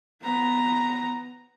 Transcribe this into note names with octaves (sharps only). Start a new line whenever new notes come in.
B3 A#5